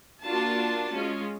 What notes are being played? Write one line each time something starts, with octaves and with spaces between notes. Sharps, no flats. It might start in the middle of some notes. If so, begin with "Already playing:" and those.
A#3 D4 F4 F#4 A5
G#3 C#4 F4